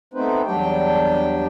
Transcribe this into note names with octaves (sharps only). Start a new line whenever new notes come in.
A3 B3 C4 D#4 B4 C5
E2 F#3 G3 D4 G4 G5